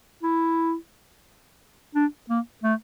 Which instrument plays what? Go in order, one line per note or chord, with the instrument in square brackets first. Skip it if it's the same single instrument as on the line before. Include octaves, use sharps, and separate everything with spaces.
[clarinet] E4
D4
A#3
A3